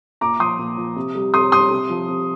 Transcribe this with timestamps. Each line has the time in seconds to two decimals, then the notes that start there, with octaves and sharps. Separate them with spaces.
0.21 A#2 A#5 D6
0.40 F3 C6 D#6
0.59 A#2
0.78 F3
0.96 C3
1.15 G3
1.34 C3 C6 D#6
1.52 G3 C6 D#6
1.71 C3
1.90 F3
2.09 C3